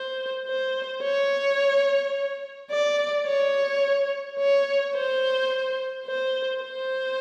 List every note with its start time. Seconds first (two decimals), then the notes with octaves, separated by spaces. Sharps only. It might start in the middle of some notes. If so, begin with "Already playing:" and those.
Already playing: C5
0.47 C5
1.02 C#5
2.71 D5
3.26 C#5
4.39 C#5
4.95 C5
6.07 C5
6.62 C5